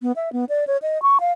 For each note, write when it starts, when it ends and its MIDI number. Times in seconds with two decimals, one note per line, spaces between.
0.02 0.12 59
0.16 0.32 76
0.33 0.45 59
0.49 0.64 74
0.67 0.77 73
0.82 1.01 75
1.02 1.18 85
1.20 1.32 77